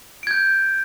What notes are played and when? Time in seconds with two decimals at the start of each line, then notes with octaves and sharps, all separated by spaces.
0.23 D7
0.27 G#6
0.31 G6